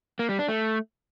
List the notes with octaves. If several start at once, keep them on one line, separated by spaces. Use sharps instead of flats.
A#3
G3
D4
A3